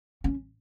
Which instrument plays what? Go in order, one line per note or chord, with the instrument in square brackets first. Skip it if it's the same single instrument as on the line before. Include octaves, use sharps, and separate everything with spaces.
[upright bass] C#4